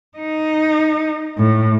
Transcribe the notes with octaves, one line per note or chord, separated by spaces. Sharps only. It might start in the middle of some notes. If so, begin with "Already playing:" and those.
D#4
A2